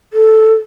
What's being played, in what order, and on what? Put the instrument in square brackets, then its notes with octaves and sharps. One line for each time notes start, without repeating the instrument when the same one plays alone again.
[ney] A4